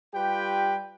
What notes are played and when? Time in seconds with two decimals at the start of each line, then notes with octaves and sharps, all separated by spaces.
0.15 G3 F4 G4 B4 G5